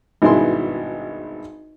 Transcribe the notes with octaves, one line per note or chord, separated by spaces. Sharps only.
G#1 G2 B2 E4 G#4 C6